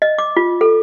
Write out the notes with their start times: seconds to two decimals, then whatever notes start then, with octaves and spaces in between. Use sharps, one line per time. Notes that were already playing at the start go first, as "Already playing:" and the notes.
0.02 D#5
0.18 D6
0.37 F4
0.61 A4